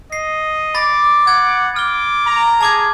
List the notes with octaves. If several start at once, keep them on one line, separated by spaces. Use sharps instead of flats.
D#5 C7
B5 D6 A6 A#6
F#5 G#6
D6 F6 G7
A#5
G#4 A5 D6 G#6